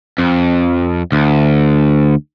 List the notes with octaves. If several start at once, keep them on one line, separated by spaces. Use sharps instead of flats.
F2
D2